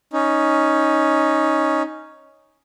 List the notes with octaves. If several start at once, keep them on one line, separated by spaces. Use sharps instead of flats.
C#4 D#4